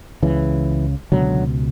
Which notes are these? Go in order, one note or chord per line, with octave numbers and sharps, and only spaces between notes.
C#2 C#3 E3
C#2 B2 D3 F#3